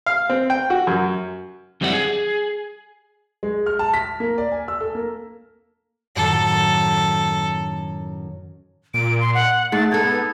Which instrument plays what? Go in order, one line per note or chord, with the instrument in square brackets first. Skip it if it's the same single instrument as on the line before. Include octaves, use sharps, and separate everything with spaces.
[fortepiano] F5
C4
G5
F#4
F#2
[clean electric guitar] F2 G3 C4 E4 A4 F#5
G#4
[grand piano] G#3
F6
A5
B6
A#3
D5
G#5
E6
A4
A#3
[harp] F#2 A2 D#3 [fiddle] A4
[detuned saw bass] A#2 [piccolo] D7
[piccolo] C6
F#5
[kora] G#2 [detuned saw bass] A3 [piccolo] A6
[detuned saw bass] B3 [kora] D#4 A4 [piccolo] G#6